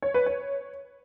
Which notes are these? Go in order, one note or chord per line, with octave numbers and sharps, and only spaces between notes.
C#5
B4
C#5